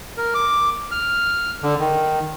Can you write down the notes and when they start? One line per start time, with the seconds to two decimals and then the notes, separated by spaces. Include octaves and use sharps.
0.17 A#4
0.35 D6
0.91 F6
1.63 D3
1.79 D#3